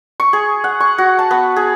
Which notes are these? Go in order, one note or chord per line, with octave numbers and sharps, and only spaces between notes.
C#6
G#4
F#5
C#6
F#4
A5
B3
G#4